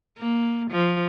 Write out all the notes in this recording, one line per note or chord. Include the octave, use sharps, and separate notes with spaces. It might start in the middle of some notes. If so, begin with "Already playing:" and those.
A#3
F3